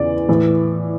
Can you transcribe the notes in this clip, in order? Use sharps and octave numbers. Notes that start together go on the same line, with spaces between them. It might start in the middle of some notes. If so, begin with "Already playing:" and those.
Already playing: E2 C#3 E3 D5
A2 E3